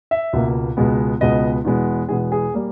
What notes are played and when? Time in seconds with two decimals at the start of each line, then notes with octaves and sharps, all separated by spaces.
0.11 E5
0.33 C#2 B2 A#3
0.77 C#2 B2 G#3 B3
1.21 C#2 B2 G#3 B3 D#5
1.65 E2 B2 G#3 B3
2.09 E2 B2 G#3 B3 G#4
2.32 G#4
2.54 G3 A#3